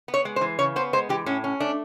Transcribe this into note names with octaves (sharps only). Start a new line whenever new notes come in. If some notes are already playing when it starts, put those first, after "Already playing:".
B3
C#5
G#3
C5
E3
C#3 C#5
B3 C5
G#3 C5
E3 G4
A2 C#4
C#4
A3 D4